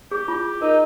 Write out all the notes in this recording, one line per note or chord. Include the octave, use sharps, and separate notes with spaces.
G4 G#4
F4
D#4 A#4